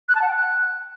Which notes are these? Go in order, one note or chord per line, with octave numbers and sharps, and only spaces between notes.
F#6
A5
F#5
G5
F#6